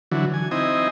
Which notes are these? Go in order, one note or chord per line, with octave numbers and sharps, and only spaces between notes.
D3 E3 F#3
G#5
C4 D#4 E4 D#5 G#5